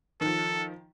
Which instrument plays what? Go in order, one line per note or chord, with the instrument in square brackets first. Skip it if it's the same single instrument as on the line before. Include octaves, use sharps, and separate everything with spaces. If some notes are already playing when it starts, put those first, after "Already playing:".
[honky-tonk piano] D#3 F3 [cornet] A4